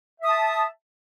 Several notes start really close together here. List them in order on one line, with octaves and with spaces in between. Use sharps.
E5 D#6 A5